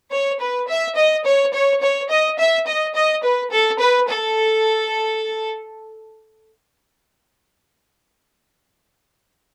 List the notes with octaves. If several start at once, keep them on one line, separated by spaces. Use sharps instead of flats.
C#5
B4
E5
D#5
C#5
C#5
C#5
D#5
E5
D#5
D#5
B4
A4
B4
A4